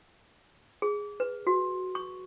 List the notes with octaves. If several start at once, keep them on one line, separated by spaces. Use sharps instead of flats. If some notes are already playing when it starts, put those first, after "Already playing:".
G#4
B4
F#4
C#6